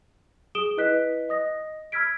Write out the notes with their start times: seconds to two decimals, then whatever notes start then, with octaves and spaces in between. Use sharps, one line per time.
0.55 G#4 D#6 D7 E7 G7
0.77 E4 B4 D#5 F#6 B6
1.29 D#5 D#6 A#6
1.92 B5 E6 F6 G#6 B6 D7